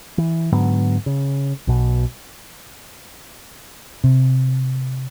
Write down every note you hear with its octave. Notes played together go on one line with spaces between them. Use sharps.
E3
G#2 D3 F#3 B3
C#3
B1 B2
C3